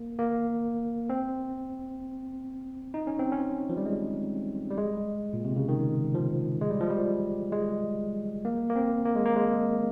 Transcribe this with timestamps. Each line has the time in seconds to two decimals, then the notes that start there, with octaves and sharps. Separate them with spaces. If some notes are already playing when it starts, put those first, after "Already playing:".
Already playing: A#3
0.19 A#3
1.10 C4
2.94 D#4
3.07 C#4
3.19 C4
3.32 C#4
3.69 F3
3.77 G3
3.86 G#3
4.70 G3
4.78 G#3
5.33 A#2
5.44 C3
5.56 C#3
5.68 D#3
6.15 F3
6.61 G#3
6.70 G3
6.80 F3
6.90 G3
7.52 G#3
8.45 A#3
8.70 A#3
8.75 C4
9.05 A#3
9.16 G#3
9.26 A#3
9.36 G#3